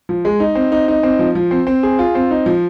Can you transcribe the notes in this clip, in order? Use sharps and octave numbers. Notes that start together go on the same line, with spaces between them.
F3
G#3
D#4
C4
D#4
D#4
C4
F3
F3
C4
C4
G#4
F4
C4
D#4
F3